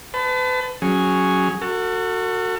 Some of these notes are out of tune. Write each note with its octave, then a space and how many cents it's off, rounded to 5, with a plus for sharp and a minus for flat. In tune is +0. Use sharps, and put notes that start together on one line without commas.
B4 +40 A5 +0
F#3 +0 C#4 +0 G#4 +0
F#4 -5 A4 +40